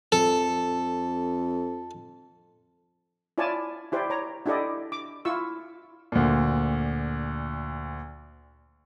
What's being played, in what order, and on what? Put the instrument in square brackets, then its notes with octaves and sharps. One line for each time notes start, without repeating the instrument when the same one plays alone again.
[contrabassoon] F2 [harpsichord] A4
[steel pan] E4 F4 C#5 D5 G#5 A5
E4 G4 C5 D5
C#5 A#5
D4 E4 G4 A4 D5 D#5
D6
E4 F4 C#6 E6
[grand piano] D2 A#2